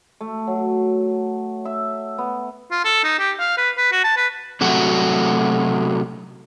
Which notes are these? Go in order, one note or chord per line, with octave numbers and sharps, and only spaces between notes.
A3
F#3
E5
B3
F4
A4
D#4
G4
F5
B4
B4
F#4
A5
B4
C3 F#3 A3 F#4